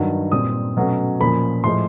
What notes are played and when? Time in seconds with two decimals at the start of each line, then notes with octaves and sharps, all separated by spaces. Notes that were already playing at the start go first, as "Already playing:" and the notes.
Already playing: G2 D#3 F#3
0.32 A#2 G3 C4 D#6
0.77 B2 F#3 A3 C#4
1.20 A#2 F3 A#3 C#4 B5
1.64 A2 F3 G#3 C6